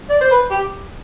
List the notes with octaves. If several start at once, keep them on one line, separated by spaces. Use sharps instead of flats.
D5
C5
B4
G4